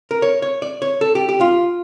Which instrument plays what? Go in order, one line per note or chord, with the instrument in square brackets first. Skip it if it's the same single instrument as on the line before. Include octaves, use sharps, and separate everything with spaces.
[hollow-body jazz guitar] A#4
C#5
C#5
D5
C#5
A4
G4
G4
F4